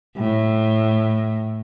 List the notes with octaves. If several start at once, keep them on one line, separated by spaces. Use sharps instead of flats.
A2